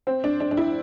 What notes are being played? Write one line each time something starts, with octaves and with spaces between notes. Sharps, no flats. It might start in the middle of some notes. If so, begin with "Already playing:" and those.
C4
D4
D4
D4
E4